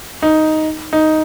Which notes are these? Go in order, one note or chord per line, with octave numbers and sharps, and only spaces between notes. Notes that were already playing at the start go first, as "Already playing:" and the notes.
D#4
D#4